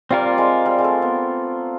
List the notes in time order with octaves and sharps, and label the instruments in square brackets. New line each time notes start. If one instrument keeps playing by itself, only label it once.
[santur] G3 [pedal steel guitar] C4 F4 A#4 D5
[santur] G#3
G3
G#3
A3
B3